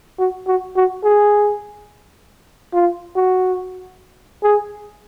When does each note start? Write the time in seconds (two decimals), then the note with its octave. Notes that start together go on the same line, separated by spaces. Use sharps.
0.19 F#4
0.47 F#4
0.76 F#4
1.04 G#4
2.73 F4
3.16 F#4
4.43 G#4